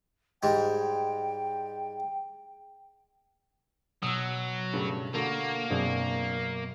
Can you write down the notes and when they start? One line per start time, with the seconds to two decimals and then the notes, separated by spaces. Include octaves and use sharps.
0.43 G#2 G3 G#3 G5
4.03 B2 F#3 D#6 E6
4.73 G2 C#3 A3
5.14 D3 A3 A#3 F#4 A4
5.70 F#2 B2 C4 D4 G#4 C#6